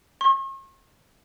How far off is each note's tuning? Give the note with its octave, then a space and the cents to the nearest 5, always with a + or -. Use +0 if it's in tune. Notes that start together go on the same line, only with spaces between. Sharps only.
C#6 -45